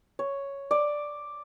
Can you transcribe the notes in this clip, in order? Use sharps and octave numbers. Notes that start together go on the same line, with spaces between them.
C#5
D5